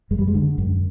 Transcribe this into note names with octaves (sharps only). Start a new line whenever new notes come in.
F#2 G#3
G3
G#3
D3
F#2